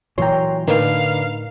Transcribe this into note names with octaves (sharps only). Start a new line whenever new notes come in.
A#2 E3 F#3 C#5 G5 A#5 C6
A2 D3 D#4 A#4 B4 F5